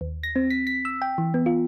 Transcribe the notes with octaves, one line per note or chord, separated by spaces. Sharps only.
D#2
A#6
C4
B6
B6
E6
G5
E3
B3
F4